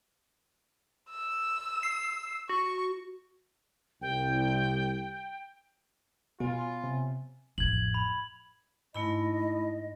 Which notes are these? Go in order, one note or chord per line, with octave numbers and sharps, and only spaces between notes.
E6
C7
F#4 C#6
C2 G5
B2 B3 F4 C#5 G#5
C3
A1 F2 G#6 F#7
B5
G#2 A3 E4 D#5 B5